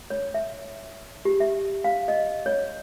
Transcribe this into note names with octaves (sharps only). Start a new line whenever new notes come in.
C#5
E5
G4
E5
F5
D#5
C#5